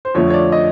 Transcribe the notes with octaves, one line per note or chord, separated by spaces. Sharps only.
C5
F2 D3 F3 A3 C#5
C#5
D5
D#5